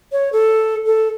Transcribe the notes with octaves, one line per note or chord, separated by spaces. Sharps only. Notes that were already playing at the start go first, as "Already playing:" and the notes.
C#5
A4
A4